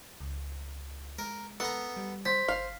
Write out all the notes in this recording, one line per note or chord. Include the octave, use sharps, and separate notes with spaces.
C#2
G#3 A#4
B3 A4 A#5
G3
C5 B6
G1 F5